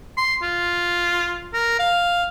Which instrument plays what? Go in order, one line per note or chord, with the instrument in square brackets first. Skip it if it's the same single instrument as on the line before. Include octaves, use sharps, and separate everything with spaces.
[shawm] C6
F4
A#4
F5